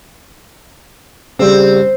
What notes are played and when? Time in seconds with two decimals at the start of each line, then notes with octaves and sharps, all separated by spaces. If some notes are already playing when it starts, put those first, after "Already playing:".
1.39 C#3 G3 C4